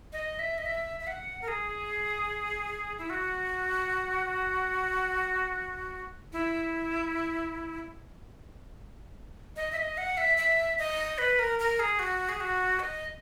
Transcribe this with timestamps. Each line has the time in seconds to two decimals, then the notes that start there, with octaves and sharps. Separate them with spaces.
0.13 D#5
0.39 E5
0.58 D#5
0.66 E5
1.00 E5
1.07 F#5
1.42 A#4
1.48 G#4
2.98 E4
3.10 F#4
6.33 E4
9.56 D#5
9.72 E5
9.77 D#5
9.98 F#5
10.17 E5
10.38 E5
10.79 D#5
11.18 B4
11.39 A#4
11.59 A#4
11.80 G#4
11.99 F#4
12.29 G#4
12.40 F#4
12.80 D#5